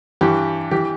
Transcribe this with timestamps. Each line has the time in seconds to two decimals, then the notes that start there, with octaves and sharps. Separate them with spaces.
0.21 G2 E3 G4
0.71 E3 G4